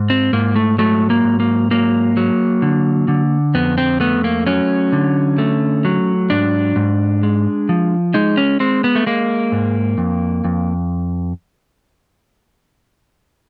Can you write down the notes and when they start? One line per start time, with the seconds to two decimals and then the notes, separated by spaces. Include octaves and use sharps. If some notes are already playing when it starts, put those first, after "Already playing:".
Already playing: G#2
0.10 C4
0.33 G#2 A#3
0.56 A3
0.79 F#3 A3
1.10 A#3
1.24 G#2
1.40 A#3
1.71 F#3 A#3
2.17 F#3
2.62 D3
3.08 D3
3.54 F2 B3
3.78 C4
4.00 A3 B3
4.24 A#3
4.46 F#3 C#4
4.92 D3
5.38 A3
5.85 F#3
6.30 G#2 D4
6.76 G#2
7.23 G#3
7.69 F3
8.14 G#3 D#4
8.37 C#4
8.60 G#3 C4
8.84 B3
8.95 A3
9.06 G#3 A#3
9.52 G#2
9.98 F2
10.45 F2